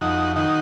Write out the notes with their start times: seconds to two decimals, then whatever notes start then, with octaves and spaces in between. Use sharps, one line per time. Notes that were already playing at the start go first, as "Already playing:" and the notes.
0.01 F2 D#4 F#4
0.36 D#3 D#4 F#4